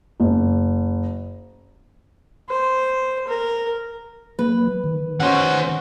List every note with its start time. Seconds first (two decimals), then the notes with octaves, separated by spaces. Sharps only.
0.20 F#1
2.50 C5
3.28 A#4
4.39 F#3 A#3 B4
4.84 D#3
5.20 C#4 F#4 C5 F#5